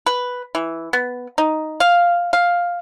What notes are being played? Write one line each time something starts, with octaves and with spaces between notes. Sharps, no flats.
B4
E3
B3
D#4
F5
F5